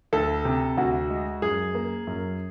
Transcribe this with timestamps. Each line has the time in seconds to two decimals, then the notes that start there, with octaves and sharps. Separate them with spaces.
0.13 D2 A4
0.45 C3
0.77 D2 F#4
1.10 G#3
1.42 F#2 G#4
1.75 A#3
2.07 F#2